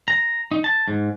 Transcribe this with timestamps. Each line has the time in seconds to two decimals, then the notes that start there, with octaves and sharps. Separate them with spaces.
0.08 A#5
0.51 D#4
0.64 A5
0.88 G#2